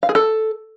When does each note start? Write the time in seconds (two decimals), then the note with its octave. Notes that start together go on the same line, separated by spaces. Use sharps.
0.03 F5
0.09 G#4
0.15 A4